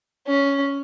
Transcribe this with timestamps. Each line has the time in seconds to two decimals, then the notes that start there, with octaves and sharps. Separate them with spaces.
0.27 C#4